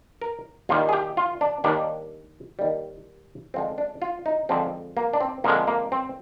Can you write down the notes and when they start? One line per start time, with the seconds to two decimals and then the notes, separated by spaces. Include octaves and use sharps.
0.22 A#4
0.69 D#2 D#3 G3 F4
0.89 G#4
0.93 G4
1.17 F4
1.41 D4
1.64 D#2 D#3 G3 D4
2.59 D#2 D#3 G3
3.54 F2 D3 F3 G#3 C4
3.78 D4
4.02 F4
4.26 D#4
4.49 F2 D3 F3 G#3 C4
4.97 A#3
5.13 D4
5.21 C4
5.44 F2 D3 F3 G#3 A#3
5.67 A#3
5.92 C4